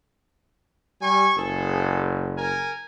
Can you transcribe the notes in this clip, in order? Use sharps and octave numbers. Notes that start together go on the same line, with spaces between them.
G3 G#5 C#6
F#1 G#4 A4
A#4 G#5